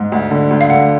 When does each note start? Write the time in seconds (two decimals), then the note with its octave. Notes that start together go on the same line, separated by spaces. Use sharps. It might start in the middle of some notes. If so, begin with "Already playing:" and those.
Already playing: G#2
0.12 D2
0.31 D3
0.51 D2
0.61 F5
0.70 D3 F#5